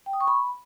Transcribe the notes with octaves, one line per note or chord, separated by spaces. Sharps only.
G5
D#6
C#6
B5